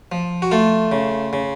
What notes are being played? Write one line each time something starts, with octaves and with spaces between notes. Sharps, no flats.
F3
F#4
A3 F4
C#3
C#3